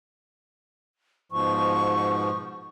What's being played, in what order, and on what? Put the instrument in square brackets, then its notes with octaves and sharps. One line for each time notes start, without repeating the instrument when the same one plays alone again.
[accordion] G#2 B2 F3 [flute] C#6